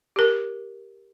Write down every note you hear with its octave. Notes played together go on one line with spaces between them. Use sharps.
G4 A#4